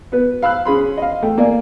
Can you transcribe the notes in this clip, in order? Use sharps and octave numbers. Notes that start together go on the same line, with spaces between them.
B3 B4
F5 B5 E6 F#6
C#4 G#4 B5 C6
D#5 F5
A3 G5
A#3 D5 F5 G#5